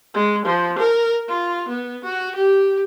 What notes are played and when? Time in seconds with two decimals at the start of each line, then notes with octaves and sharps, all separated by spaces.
0.14 G#3
0.45 F3
0.78 A#4
1.29 F4
1.68 B3
2.04 F#4
2.35 G4